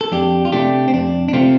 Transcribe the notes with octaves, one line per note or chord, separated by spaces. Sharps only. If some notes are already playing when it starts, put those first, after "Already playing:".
A4
F2 D4 G4
F4
C3 A3 D4 G4
C4
F2 D4
D4
C3 A3 C4 F4